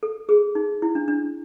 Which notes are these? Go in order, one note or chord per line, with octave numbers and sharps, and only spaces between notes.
A4
G#4
D#4
E4
D4
D4